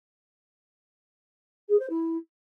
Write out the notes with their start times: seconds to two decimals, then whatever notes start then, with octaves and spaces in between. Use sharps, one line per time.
1.69 G#4
1.79 C5
1.90 E4